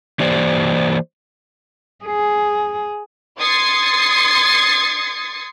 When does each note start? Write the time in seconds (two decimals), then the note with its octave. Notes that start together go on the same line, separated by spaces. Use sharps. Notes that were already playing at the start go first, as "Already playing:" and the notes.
0.20 E3 A#3 G4 C5 D5
2.05 G#4
3.39 C6 D#6 G#6 A6 C7 C#7